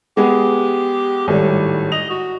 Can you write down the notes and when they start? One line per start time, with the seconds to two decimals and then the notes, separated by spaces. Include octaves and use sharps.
0.17 G#3 B3 G4 G#4
1.28 G#1 A2 G3
1.92 D#5 F7
2.10 F#4